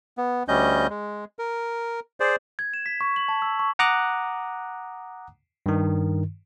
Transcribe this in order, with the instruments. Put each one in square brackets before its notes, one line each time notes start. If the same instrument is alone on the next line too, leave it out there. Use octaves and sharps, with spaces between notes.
[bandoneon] B3
D2 G3 C#4 D#5 G6
G#3
A#4
G#4 C5 D5
[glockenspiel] G#6
E7
B6
C#6
F#7
A5
E6
C#6
[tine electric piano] F#5 A#5 D6 D#6 F#6
G2 D#3